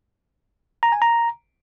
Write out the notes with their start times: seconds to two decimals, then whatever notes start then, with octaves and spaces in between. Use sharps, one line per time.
0.83 A#5
0.92 G#5
1.02 A#5